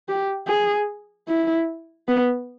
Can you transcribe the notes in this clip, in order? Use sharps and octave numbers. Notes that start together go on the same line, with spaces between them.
G4
G#4
E4
B3